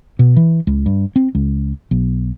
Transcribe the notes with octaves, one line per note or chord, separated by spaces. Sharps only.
B2
E3
C#2
G2
C4
C#2
B1